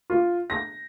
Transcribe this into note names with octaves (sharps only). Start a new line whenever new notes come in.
F4
A#6